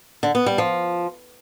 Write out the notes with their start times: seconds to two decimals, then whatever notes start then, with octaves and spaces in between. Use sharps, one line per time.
0.23 D3
0.35 B3
0.46 G3
0.58 F3